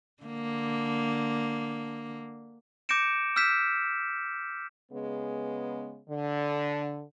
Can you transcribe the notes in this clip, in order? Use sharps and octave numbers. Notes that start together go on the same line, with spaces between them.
D3 A#3
D6 G6 A#6 C#7 D7 E7
E6 F6 G6 B6 E7
C#3 G#3 B3
D3